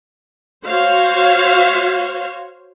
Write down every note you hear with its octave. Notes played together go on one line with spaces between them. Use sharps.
F#4 C5 C#5 F5